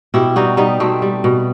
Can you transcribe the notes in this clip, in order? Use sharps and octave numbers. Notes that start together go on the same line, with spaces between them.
B2 E4 G4
G3 D#4 F#4
G3 B3 D#4
B2 A3 C4
G3
B2